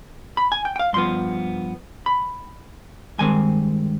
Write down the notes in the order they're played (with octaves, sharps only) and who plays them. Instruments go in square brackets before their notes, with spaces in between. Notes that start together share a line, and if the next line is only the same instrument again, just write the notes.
[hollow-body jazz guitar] B5
G#5
G5
G5
F5
G2 F3 B3 C6
B5
G2 D#3 G#3 C4 G#5